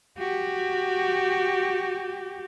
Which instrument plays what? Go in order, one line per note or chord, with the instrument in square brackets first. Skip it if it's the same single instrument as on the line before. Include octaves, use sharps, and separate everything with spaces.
[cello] F#4 G4